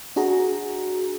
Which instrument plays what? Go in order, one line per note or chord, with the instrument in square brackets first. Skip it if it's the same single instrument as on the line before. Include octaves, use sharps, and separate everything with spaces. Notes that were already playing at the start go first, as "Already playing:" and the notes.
[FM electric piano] D4 F#4 G#4 A#5